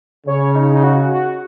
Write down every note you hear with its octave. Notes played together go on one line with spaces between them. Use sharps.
C#3 C#5
D#4
D#4
F#4
F#4